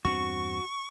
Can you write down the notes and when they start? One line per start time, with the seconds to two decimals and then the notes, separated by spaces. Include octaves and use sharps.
0.05 E2 G2 C4 F#4 C#6